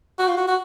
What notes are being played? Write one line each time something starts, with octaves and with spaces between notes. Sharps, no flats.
F#4
F4
F#4
F#4